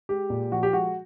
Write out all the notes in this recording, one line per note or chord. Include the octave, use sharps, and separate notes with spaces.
G#3 G4
A#2
F3 F#4
G4
G#3 F#4